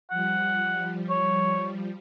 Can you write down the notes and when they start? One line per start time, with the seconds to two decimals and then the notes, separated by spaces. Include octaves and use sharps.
0.11 F3 G3 F#5
1.10 C#5